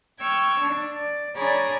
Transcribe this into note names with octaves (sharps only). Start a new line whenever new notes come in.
G5 C#6 E6 F6 G#6
D4
D5
D4 G#4 C#5 D5 A#5 B5